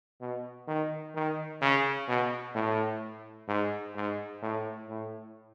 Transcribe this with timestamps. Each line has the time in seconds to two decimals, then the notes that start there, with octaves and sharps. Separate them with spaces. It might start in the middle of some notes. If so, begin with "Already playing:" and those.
0.21 B2
0.68 D#3
1.15 D#3
1.61 C#3
2.09 B2
2.55 A2
3.48 G#2
3.95 G#2
4.42 A2
4.89 A2